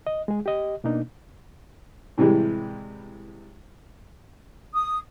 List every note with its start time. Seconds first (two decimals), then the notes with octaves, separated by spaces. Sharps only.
0.07 D#5
0.28 G#3 G#4
0.46 G4 D#5
0.84 B2 A#3 D4 D#4
2.18 A2 C3 E3 G3 G#3
4.74 D#6